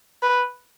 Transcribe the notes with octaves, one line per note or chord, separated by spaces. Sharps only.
B4